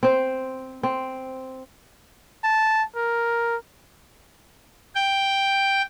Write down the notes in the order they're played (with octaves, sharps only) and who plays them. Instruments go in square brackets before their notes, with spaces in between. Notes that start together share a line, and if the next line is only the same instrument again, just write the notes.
[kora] C4 C5
C4
[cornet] A5
A#4
[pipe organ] G5